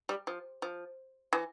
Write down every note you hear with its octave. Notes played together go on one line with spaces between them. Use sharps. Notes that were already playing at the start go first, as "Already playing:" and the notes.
G3
F3
F3
E3